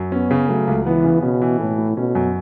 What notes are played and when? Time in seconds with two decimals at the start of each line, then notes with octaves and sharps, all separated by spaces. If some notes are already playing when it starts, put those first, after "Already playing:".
Already playing: F#2
0.12 B3 C#4
0.31 C#3
0.49 F#3 A3
0.67 C#2
0.86 E3 B3
1.05 C#3
1.22 B2 C#4
1.42 E3
1.60 A2 A4
1.78 A3
1.97 B2 C#4
2.15 F#2